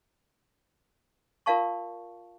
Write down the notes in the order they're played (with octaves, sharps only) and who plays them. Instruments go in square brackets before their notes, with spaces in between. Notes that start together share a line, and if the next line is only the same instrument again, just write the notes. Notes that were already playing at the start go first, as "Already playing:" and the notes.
[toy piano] F4 A#4 D5 F5 A5 C#6